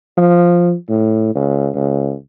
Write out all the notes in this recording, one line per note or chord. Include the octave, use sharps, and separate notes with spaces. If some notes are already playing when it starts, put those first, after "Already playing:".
F3
A2
C#2
C#2